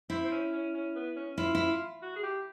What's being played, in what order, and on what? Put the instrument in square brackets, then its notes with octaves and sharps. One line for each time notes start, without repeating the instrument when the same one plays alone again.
[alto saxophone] C4 [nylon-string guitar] E4
[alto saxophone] C4
C#4
C#4
C#4
B3
C#4
[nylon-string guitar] E4 [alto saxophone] F4
[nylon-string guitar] E4
[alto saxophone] F#4
G#4
G4